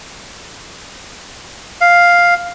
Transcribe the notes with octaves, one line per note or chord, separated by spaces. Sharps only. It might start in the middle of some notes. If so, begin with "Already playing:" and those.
F5